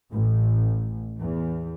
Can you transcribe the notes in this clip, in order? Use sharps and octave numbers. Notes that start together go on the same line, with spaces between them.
A1
E2